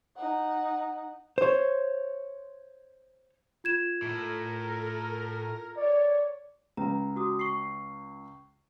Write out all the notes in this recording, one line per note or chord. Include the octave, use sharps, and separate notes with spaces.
D#4 F#5
C5 C#5
F4 G#6 E7
A2 A4 A#4
C#5 D5
C#2 A#5
F#4 D6 D#6
C#6 C7